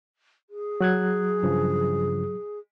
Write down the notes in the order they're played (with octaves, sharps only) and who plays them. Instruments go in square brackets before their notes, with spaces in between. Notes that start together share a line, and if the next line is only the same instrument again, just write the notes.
[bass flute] G#4
[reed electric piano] F#3 F#6 G#6
[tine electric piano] G2 C#3 F3